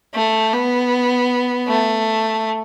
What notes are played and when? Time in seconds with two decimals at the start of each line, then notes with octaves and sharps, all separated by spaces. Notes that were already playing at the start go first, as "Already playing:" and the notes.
0.15 A3
0.53 B3
1.68 A3